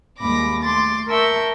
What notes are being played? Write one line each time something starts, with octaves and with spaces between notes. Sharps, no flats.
D#2 G3 G#3 B5 D6 A#6
A3 C6 D6 A6
A#4 E5 A5 C#6 E6 G6